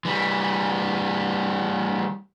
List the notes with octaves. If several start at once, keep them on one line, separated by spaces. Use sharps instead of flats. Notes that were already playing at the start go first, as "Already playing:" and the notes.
E3 G3